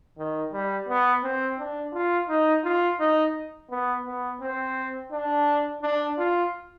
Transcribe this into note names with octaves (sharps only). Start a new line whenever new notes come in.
D#3
G3
B3
C4
D4
F4
D#4
F4
D#4
B3
B3
C4
D4
D4
F4